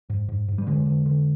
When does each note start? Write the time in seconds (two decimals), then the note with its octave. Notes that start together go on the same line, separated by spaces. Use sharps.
0.10 G#2
0.29 G#2
0.48 G#2
0.58 G3
0.67 D3 G#3
0.86 D3
1.06 D3